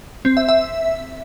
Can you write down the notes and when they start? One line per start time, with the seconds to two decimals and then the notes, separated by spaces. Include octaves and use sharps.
0.25 C4
0.37 E5
0.49 E5